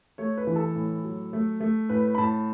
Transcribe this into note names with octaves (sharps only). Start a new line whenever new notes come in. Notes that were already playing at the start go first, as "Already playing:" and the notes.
A3 C#5
B4
E3
A4
A2
F#3
A3
A3
A2 B4
B5
A2 A5